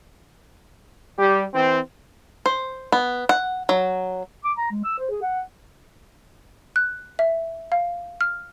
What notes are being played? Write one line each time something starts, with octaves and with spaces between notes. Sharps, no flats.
G3 G4
E3 C4
C5
B3
F#5
F#3
D6
A#5
G#3
E6
C5
G#4
F#5
F#6
E5
F5
F6